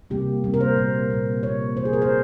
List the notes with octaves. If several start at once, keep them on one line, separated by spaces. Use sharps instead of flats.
C3 G3 A#3 G4
C3 G3 A#3
A#4
C5
A#2 G3 A#3
A#2 G3 A#3
C3 F3 A#3 C#5
C3 F3 A#3 C5
G#4
A#4
C5